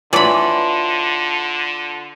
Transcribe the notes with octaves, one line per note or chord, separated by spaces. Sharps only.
D3 E3 F#3 F4 D5 A5 B5 C6